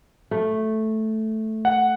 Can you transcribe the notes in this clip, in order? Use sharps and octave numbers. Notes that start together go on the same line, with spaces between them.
A3
F#5